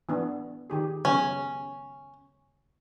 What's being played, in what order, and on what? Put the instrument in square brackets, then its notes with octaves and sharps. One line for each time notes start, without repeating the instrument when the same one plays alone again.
[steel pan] E3 B3 D4
D#3 G4 G#4
[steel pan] C#3 F#3 B3 [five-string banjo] C#4